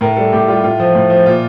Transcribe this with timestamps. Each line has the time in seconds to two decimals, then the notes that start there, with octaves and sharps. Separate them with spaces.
0.01 A2 A#4
0.17 G3 A4
0.32 A2 G4
0.48 G3 F4
0.64 A2 F4
0.80 F3
0.95 A2
1.10 F3
1.26 A#2 F4